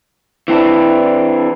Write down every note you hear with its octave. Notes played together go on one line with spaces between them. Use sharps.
E3 C4 D4 E4